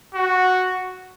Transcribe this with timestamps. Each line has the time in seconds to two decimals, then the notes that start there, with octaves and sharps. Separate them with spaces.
0.15 F#4